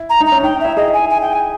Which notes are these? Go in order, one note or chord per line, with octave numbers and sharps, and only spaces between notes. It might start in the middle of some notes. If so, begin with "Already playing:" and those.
Already playing: E4
A#5
D#4
A#5
C#4
D#4 G5
E4 E5
G#4 D#5
G#5
G#5
G5
G#5